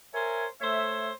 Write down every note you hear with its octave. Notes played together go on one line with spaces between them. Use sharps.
A#4 C5 C#5 E5 G#5
A3 C5 C#5 E5